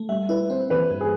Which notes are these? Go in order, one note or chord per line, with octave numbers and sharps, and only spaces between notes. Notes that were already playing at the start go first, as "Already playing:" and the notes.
Already playing: A3
G3 E5
E4 B4
C4 C5
E3 B4
G2
G#4